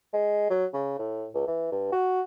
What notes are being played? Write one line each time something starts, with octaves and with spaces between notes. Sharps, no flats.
G#3
F#3
C#3
A2
C#2
E3
G2
F#4